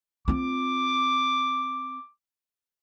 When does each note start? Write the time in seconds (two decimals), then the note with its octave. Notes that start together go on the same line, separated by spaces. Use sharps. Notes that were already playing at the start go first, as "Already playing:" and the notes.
0.28 C4 F4 D6